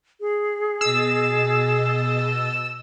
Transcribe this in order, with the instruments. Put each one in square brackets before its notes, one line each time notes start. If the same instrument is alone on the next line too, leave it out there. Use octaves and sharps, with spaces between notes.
[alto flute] G#4
[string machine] B2 D#5 A6 [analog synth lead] E6